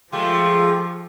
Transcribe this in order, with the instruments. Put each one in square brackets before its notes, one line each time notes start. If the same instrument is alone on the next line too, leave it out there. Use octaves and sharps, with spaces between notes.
[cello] F3 [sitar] G#3 A3 [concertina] F4 G4